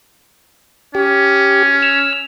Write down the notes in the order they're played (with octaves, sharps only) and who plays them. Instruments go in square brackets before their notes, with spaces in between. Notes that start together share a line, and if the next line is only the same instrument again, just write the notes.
[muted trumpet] C#4 [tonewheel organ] G4
[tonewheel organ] E6 F6